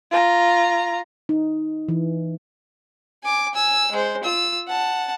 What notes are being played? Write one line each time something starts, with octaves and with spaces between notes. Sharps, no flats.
F4 A#5
D#4
E3
G#5 D6
G#5 E6
G#3 C5
F4 E6
F#5 A5